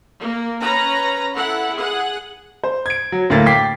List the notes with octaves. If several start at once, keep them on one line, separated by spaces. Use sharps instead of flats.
A#3
C#4 B4 A#5
E4 A4 F#5
G#4 F#5
C5
G#6 D7
F#3
D2 A2 A#3 F5 A6
G5 D6 B6 C7